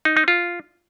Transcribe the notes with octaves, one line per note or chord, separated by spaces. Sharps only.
D#4
D#4
F4